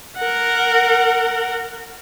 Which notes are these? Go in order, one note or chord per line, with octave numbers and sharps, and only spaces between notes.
A#4 F#5